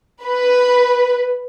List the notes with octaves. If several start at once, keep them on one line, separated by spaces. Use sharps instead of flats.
B4